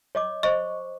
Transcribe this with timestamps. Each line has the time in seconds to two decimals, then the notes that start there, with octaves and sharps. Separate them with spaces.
0.15 C#5 D#5 D6
0.43 C5 D#5 C#6